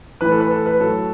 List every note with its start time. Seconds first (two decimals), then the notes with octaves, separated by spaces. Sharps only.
0.21 A2 E3 B4
0.31 A4
0.40 B4
0.50 A4
0.66 B4
0.80 A2 F#3 A4